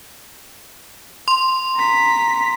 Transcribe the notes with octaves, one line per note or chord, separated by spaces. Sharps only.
C6
A#5 B6